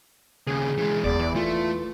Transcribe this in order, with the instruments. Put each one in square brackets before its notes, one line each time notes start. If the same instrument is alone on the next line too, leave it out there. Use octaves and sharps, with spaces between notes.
[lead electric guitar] D#2 C#3 [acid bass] G#4
[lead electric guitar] E3 G#3
[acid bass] F#1 [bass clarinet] E2 [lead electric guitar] D5
[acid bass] E3
[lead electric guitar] A3 [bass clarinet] F4